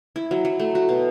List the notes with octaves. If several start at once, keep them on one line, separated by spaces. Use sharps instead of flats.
E4
F#3
F#3
A3
F#4
B2